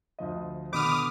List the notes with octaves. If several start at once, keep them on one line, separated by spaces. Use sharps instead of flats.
D2 F3 D#5
B2 D3 D#3 B5 D6 D#6 F6